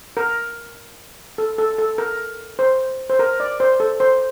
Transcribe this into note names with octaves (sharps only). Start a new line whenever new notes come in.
A#4
A4
A4
A4
A#4
C5
C5
A#4
D5
C5
A4
C5